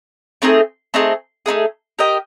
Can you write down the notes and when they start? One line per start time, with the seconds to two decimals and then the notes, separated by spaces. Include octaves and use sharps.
0.42 A3 C4 D#4 G#4
0.94 A3 C4 D#4 G#4
1.46 A3 C4 D#4 G#4
1.99 G4 A#4 D#5 G5